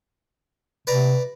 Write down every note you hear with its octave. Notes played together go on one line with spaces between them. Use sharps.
C3 B4 D5 A#5